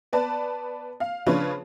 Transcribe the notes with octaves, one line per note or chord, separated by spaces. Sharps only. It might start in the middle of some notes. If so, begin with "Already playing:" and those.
B3 B4 D5 A5
F5
C#3 F3 D4 F4 B4 C#5